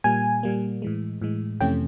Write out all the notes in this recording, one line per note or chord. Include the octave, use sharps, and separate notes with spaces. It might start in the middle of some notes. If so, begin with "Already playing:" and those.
A#2 G3 A#3 G#5
A#2 G3 A#3
A2 E3 G#3
A2 E3 G#3
F2 C3 E3 A3 C#4 G5